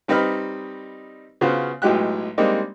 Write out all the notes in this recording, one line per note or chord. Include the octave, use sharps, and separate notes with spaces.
G3 C4 D#4 B4 D#5 F6
C#3 B3 F4 F#4 C5
B1 A2 F#3 G#3 G4 F#6
G3 G#3 A#3 C4 D4 D#4